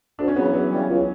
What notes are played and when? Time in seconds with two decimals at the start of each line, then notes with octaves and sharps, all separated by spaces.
0.19 D2 D4
0.28 C#4
0.36 C#3 F#3 B3
0.46 E3
0.54 E2 F#3
0.71 C#3 E3 G3
0.89 C#2